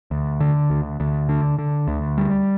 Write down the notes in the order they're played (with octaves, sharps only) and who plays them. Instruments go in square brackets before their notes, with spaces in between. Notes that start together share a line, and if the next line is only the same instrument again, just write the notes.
[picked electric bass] D2
D3
D2
D2
D3
D3
D2
G3